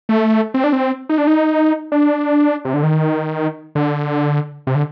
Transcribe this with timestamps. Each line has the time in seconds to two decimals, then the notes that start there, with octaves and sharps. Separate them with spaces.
0.09 A3
0.54 C4
0.64 D4
0.73 C4
1.09 D#4
1.18 D4
1.27 D#4
1.92 D4
2.65 C3
2.74 D3
2.83 D#3
3.75 D3
4.67 C3
4.75 D3